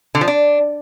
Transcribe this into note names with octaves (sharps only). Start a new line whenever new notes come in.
D3
F3
D4